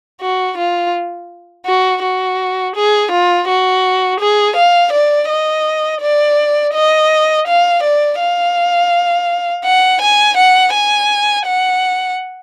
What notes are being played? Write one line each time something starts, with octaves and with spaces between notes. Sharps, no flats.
F#4
F4
F#4
F#4
G#4
F4
F#4
G#4
F5
D5
D#5
D5
D#5
F5
D5
F5
F#5
G#5
F#5
G#5
F#5